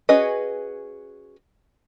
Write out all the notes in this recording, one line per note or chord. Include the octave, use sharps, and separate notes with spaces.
C#4 F#4 G#4 B4 D#5